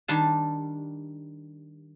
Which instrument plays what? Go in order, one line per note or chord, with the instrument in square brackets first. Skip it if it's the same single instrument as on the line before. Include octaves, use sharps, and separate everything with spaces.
[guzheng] D#3 G3 D4 A5